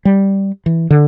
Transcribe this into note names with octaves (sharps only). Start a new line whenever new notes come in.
G3
E3
D3